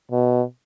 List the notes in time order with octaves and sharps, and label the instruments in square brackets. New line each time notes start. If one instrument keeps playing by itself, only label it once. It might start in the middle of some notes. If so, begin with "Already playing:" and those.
[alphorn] B2